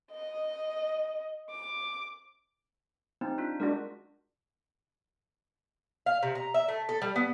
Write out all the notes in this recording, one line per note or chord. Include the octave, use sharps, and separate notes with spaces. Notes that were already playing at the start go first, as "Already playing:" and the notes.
D#5
D6
C4 D#4
D4 F4
G#3 D4 F#4 A#4
F5
C3
A#5
E5
A3
A4
G3
B3